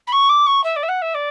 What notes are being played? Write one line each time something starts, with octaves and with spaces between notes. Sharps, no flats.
B5
C#6
D6
C#6
E5
D5
E5
F#5
E5
D5